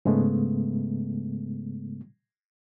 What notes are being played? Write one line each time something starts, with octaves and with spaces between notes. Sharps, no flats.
G#2 C#3 G#3 A3 B3